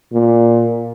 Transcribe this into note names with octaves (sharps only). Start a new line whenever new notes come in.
A#2